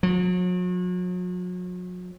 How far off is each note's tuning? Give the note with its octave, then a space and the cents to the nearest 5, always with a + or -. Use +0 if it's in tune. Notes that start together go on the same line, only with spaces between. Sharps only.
F#3 -40